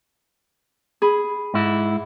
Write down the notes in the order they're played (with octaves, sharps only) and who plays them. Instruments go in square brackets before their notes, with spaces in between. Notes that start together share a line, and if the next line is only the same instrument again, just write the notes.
[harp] G#4 B5
[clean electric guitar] G#2 E4